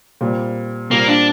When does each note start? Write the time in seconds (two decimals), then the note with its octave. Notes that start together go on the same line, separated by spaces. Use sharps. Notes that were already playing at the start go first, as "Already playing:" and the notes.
0.21 A#2 G3 C4
0.91 A#2 G3 A#3 C4
1.08 D4